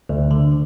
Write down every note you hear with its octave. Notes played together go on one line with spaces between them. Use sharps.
D2
D3